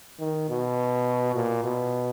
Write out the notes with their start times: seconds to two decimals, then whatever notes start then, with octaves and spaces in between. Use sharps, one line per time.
0.20 D#3
0.49 B2
1.35 A#2
1.64 B2